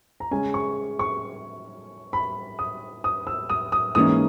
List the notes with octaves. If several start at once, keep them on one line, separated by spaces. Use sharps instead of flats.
A#5
C#3 G#3 C#4 G#5
C#6
C#6
B5
D#6
D#6
E6
D#6
D#6
G#2 E3 A#3 C#4 D#6